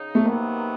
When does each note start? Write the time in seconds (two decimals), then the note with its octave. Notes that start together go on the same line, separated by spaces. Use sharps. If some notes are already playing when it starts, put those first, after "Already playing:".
Already playing: C#3 D#4
0.15 A3
0.25 C3 D#3 F#3 A#3 B3